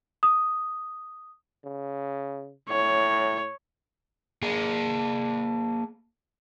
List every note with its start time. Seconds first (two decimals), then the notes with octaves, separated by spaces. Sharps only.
0.23 D#6
1.65 C#3
2.69 A2 C#5
4.42 A#3 G#4